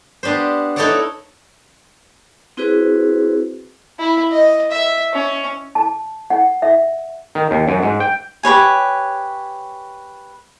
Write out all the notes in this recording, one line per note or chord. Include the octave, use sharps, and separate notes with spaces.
B3 D4 G4 C5
D#4 E4 A4 C#5 D5 F#5
C4 E4 F#4 G#4 B4 C5
E4
D#5
E5
C#4
A5
F#5
E5
D#3
D#2
F#2
G#2
G5
G4 B4 C#5 G#5